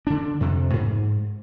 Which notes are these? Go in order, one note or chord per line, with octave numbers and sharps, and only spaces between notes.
D3 D4
F2 C3
G#2